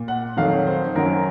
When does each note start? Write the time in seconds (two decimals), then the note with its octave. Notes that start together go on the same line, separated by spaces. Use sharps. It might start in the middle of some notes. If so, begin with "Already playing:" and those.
Already playing: A#2
0.08 F#5
0.37 F2 D#3 F#3 F5
0.51 C#5
0.67 C5
0.95 F#2 D#3 F#3 A#4